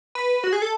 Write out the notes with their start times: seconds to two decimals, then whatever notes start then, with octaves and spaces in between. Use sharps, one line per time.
0.15 B4
0.44 F#4
0.53 G#4
0.62 A4